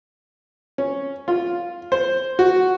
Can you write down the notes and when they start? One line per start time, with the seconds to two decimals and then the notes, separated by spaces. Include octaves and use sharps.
0.78 C#4
1.28 F4
1.92 C5
2.39 F#4